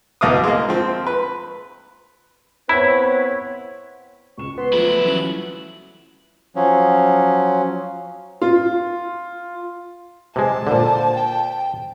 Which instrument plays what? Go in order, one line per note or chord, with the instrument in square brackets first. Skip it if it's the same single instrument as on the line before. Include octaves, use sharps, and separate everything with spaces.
[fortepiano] C2 B2 D#5 F5 D6 D#6
G#3 A#3
F3 C4
B4
[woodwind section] B3 B4 C#5 [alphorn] C4 [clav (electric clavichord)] E4 [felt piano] B5
[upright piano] C#2 E7 [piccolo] C#6
[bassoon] B3 [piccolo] C6
[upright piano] F3 A3 [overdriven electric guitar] F#3 E4 [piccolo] F#7
[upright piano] E3 G3 C#4 [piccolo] F#7
[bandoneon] F3 F#3 C#4
[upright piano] F4
[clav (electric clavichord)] C3 G#3 [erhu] A5
[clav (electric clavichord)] A#2 D3 [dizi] C5
[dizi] G5